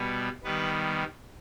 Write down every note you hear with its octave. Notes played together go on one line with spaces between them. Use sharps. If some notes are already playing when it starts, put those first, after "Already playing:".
Already playing: B2 G3 B3
D#3 G3 B3 B4